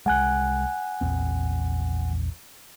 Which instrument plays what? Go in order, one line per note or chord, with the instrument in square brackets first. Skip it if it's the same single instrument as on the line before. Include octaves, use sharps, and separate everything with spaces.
[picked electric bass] C2 G#3 [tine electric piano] F#5 G#5 F#6
[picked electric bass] A#1 E2 C4